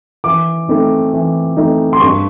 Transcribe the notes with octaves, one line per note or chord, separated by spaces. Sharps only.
E3 D6
A3 C4 D#4
E3
A3 C4 D#4
C6
G2 C#6